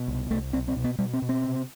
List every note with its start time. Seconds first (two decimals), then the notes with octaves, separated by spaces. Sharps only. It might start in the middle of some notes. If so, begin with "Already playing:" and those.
Already playing: B2
0.08 C2
0.31 C2 A3
0.53 B1 C4
0.68 C4
0.76 B2
0.84 B3
0.99 B2 G3
1.13 C4
1.22 B2
1.29 C4
1.44 C3